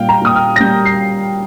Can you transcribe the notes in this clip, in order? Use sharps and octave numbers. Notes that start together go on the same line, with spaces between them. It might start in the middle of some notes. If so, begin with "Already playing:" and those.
Already playing: A#2 G3 F5 G5
A#5
A#2 D#6
F6
A#6
G3 G6
C7